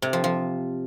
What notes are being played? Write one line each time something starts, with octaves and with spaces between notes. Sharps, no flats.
C3
F3
F3